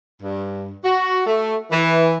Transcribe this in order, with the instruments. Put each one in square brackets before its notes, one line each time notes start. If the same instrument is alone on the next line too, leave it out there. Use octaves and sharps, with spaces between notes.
[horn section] G2
F#4
A3
E3